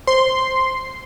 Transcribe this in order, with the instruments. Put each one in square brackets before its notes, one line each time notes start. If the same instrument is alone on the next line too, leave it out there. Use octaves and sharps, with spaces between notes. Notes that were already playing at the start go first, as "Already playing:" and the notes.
[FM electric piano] C5 [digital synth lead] C6